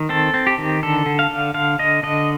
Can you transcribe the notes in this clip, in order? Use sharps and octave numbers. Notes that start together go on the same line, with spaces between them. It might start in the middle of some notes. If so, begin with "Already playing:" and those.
Already playing: D#3
C4 A4
C4
G4
D#3
D3 A4
D3
F5
D3
D3 F5
D3 D#5
D3 D#5